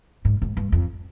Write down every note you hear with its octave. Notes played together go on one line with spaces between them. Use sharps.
G#2
G#2
G2
F2